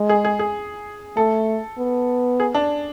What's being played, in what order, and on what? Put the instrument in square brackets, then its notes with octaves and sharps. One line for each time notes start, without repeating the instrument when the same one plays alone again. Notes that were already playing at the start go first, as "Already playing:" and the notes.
Already playing: [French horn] G#3
[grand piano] G#4
G#4
G#4
[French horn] A3 [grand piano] A4
[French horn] B3
[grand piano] G#4
D4